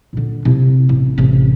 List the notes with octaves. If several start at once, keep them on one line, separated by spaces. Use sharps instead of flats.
A#2 D3
C3 E4
A1
A1 C3